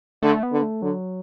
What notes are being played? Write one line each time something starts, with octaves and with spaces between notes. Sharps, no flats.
D3 A3
B3
D3
A3
D3 F#3